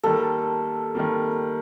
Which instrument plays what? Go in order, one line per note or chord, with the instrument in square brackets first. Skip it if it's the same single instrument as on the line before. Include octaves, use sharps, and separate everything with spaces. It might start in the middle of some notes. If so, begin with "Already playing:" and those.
[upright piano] D#3 G3 A#3 [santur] A4
[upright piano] D#3 G3 A#3